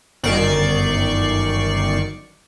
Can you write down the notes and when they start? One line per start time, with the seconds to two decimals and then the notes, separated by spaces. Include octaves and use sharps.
0.23 G1 F#2 D#3 D5 C#6 C7